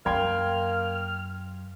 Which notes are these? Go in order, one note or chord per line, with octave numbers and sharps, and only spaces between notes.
F#2 A#3 G5 C6 F6 G#6